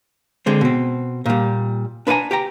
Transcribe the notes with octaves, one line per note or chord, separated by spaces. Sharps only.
D3 G#3 C4
B2 C4
A#2 G3
D4 B4 D#5 F5 G#5 A#5
G4 G5 A#5